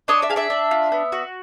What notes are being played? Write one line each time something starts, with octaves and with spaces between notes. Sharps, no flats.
D4 C#5 D#5
D5 E5
G#4 F5
D5 E5
D4
F4
B3
F#4